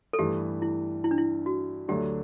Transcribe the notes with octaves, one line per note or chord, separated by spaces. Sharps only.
A4
G2 E3 A3 G4
E4
E4
D4
E4
F#4
D2 D3 F#3 A3 D4 G4